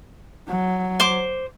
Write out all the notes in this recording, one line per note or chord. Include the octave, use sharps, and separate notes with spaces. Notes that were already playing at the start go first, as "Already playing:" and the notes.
F#3
C5 D6